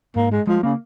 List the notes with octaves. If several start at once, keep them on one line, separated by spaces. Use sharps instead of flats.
G#2 A#3
G#3
F3 G#3
C#3 A#3